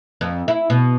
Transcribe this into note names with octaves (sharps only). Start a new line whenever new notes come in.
F2
E4
B2